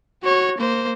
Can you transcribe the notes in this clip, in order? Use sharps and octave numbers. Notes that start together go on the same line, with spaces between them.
F#4 C#5
A#3 C5